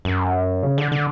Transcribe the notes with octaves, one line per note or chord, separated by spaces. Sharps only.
F#2
C#3
D3
D3